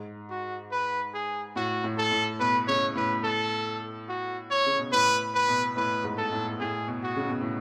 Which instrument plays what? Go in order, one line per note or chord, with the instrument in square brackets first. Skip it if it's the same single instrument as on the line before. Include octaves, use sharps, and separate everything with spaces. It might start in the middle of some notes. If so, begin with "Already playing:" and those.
Already playing: [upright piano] G#2
[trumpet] F#4
B4
G#4
[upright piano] A2 [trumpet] F#4
[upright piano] A2
[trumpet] A4
[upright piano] A2
[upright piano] B2 [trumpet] B4
[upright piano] C#3 [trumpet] C#5
[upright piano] A2 [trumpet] B4
[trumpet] A4
F#4
C#5
[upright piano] C#3
B2
[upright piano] A2 [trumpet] B4
[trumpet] B4
[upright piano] B2
[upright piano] A2 [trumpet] B4
[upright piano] G#2
[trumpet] A4
[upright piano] A2
[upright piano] A2 [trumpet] G#4
[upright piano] B2
[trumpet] F#4
[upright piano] C#3
B2
A2